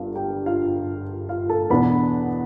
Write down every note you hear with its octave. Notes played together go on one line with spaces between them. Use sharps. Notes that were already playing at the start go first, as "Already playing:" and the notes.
Already playing: G1 G2 D3 F4 F5
G4 G5
F4 F5
F4 F5
A4 A5
E2 B2 B3 D4 B4 B5